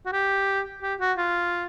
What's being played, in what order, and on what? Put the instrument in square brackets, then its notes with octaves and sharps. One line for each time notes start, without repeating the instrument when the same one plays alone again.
[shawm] F#4
G4
G4
F#4
F4